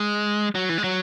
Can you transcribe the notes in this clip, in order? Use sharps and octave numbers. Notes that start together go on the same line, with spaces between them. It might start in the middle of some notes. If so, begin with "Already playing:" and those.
Already playing: G#3
F#3
E3
G#3
F#3